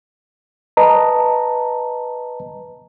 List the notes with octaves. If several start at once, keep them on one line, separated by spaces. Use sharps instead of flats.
B4 D#5 A5 A#5